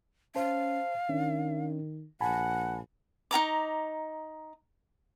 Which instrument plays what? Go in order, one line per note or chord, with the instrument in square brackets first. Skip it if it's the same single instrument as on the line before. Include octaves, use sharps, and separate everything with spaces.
[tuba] C#4 [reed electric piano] C5 A5 [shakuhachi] F5
[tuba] D#3 [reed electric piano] C#4 D4
[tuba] A#1 [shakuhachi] F#5 [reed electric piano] G#5 A5 B5
[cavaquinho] D#4 F#4 A#5 D6